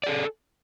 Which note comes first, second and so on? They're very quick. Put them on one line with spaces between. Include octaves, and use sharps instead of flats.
D5 G#4 A4